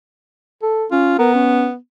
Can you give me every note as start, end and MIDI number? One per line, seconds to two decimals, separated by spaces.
0.62 0.85 69
0.91 1.15 61
0.91 1.15 65
1.19 1.76 59
1.19 1.30 70
1.35 1.67 61